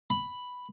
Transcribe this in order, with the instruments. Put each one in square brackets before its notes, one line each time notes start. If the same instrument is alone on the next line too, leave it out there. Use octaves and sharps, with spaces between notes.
[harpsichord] B5